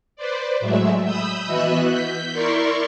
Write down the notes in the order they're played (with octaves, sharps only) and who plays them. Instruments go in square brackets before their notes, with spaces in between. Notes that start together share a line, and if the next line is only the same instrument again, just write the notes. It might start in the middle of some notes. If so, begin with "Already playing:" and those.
[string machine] B4 C5 D5
A2 F#3 G#3 A3 E5
B5 D#6 E6 G6
E3 B3 F#4 D#5 E5 F#6
G6 B6
E4 A#4 D5 C6 C#6